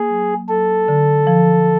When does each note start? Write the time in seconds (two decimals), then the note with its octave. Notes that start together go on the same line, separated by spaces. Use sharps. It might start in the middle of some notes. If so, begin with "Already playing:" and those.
Already playing: A#3 G#4
0.10 F#3
0.49 F#3 A4
0.88 D3
1.27 F3